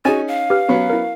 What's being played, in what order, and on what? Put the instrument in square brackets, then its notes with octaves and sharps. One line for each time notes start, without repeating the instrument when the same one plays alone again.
[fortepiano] C#4 D#4 G#5 [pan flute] F#4 [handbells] G#4 A6
[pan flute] F5
[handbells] G4 B4 F6
[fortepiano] F#3 B3 C#4
[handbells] E4 A#4